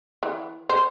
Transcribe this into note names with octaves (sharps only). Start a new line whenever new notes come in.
E3
C5